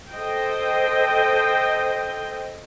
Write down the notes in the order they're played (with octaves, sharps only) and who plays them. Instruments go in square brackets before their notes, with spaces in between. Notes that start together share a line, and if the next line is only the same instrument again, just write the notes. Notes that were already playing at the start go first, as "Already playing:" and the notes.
[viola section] A4 C5 D#5 G5